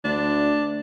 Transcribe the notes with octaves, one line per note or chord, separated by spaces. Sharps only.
D2 D4